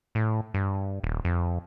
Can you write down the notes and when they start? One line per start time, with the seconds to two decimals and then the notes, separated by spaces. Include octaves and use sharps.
0.15 A2
0.54 G2
1.04 D#1
1.25 F2